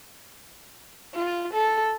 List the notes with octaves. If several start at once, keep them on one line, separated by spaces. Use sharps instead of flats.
F4
A4